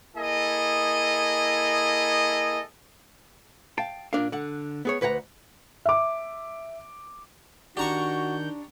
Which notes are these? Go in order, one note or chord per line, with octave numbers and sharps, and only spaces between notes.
A#3 E4 G#4 A4 D#5
F5 G5 A5
A#2 D4 A#4 F5
D3 F#5
B3 G#4 C#5
D2 B4 F#5 G5 A#5
E5 D6
D#3 D4 F#4 G4 A#5 C#6 G6